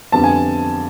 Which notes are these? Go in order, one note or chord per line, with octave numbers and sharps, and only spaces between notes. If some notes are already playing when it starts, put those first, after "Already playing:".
F2 D3 G3 B3 A5
G#5